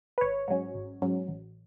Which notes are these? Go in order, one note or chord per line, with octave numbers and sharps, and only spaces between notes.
B4
G#1 C#5
G#2 F#3 C#4
G#1
G#2 F#3 C#4
A1